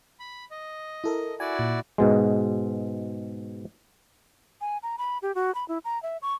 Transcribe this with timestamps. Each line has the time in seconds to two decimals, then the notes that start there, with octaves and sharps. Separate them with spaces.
0.20 B5
0.51 D#5
1.04 E4 A4 A#4
1.40 E4 F#4 D5 G#5
1.59 A#2
1.98 G#2 B2 G#3
4.61 G#5
4.83 A#5
4.98 B5
5.22 G4
5.35 F#4
5.55 B5
5.68 E4
5.85 A#5
6.03 E5
6.22 C#6